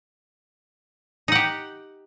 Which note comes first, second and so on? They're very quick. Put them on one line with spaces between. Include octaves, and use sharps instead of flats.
D#4 F#5 G4